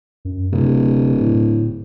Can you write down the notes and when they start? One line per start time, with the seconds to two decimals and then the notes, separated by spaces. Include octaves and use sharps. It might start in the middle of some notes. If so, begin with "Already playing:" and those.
0.25 F#2
0.52 D1 C3
1.20 A2